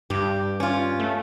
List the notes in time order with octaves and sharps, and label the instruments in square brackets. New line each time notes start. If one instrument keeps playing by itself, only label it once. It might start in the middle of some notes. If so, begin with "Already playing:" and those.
[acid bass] G2 [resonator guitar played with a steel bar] G4
[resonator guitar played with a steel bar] C#4 F4
[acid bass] A3